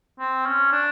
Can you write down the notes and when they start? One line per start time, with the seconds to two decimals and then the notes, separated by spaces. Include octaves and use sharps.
0.19 C4
0.46 C#4
0.72 D4